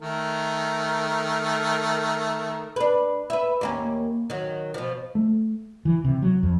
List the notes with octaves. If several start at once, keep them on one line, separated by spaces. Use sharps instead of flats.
D#3 A3 A#4
D4 B4
B4 E5
D#2 A#3 C#4
D#3 F#3
B2 F3
A3
E3
C3
F#3
F2